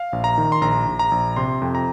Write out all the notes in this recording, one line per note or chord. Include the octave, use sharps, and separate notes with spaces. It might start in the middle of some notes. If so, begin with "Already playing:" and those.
Already playing: F5
A#1
A#5
D#3
C6
A#1 A#5
A#1
A#5
A#1
C3 C6
F2
A#5